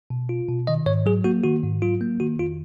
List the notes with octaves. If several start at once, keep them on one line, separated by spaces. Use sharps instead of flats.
B2
F4
B2
D#3 D#5
G#2 C#5
F#3 G#4
A#3 F#4
D#3 F#4
G#2
F#3 F4
A#3
D#3 F#4
F2 F4